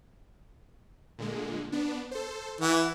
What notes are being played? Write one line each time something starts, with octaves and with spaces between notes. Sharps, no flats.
A#2 D3 G#3
B3 D4
A4 C5
E3 F#5